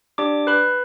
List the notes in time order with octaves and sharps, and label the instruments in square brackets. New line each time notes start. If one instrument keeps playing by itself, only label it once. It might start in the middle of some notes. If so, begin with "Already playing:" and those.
[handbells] D4 G4 D5 D6
B4 B5